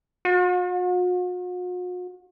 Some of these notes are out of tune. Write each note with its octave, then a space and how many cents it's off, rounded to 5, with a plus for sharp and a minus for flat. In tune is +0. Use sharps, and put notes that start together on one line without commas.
F#4 -45